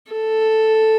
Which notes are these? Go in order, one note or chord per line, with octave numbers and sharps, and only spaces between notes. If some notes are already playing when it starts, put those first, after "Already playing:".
A4